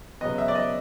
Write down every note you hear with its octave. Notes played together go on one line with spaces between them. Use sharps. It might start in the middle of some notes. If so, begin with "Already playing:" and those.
C#3 F#3 B3 D#5
E5
D5
D#5